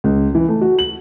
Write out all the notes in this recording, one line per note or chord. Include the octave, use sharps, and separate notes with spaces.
C#2
E3
A3
F#4
F#7